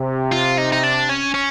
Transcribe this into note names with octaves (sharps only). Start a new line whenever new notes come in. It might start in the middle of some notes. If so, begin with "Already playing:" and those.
Already playing: C3
F4
D#4
D#4
D4
C#4
C#4